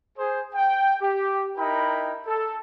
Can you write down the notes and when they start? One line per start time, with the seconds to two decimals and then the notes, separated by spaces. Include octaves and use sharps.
0.18 G#4 C5
0.54 G5
1.02 G4
1.58 D#4 E4 A#4 G5 B5
2.27 A4